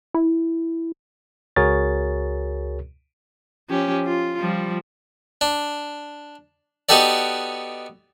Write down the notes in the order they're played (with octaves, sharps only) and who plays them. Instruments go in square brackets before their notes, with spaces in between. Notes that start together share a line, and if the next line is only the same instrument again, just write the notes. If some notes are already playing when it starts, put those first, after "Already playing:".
[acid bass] E4
[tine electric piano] C#2 F#4 G#4 A#4 C#5 A6
[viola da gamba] F3 C#4 G4
F4
F3 G3
[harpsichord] D4
B3 D#4 F#4 G4 A4 D5